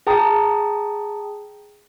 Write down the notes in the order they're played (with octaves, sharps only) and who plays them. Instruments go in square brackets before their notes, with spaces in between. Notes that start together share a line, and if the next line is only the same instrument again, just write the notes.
[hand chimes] G#4 G5 A5 A#5 D#6